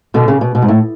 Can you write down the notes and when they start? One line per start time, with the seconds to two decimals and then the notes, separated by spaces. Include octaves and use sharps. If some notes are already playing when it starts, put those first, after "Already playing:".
0.14 B2 D3
0.28 C#3
0.41 B2
0.55 B2
0.62 G#2
0.68 A2